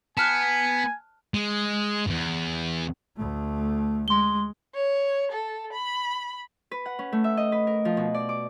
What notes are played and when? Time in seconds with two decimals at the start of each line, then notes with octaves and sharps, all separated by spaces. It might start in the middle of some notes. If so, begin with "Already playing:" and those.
0.17 B3 G#5 A5 F6 F#6
1.34 G#3
2.07 E2 G2
3.16 D2 A3
4.08 G#3 C6 G7
4.75 C#5
5.32 A4
5.73 B5
6.71 B4
6.86 F#5
6.99 C#4
7.12 A3
7.24 E5
7.37 D#5
7.52 B4
7.67 A#4
7.85 F3
7.97 B2
8.14 D5
8.29 D6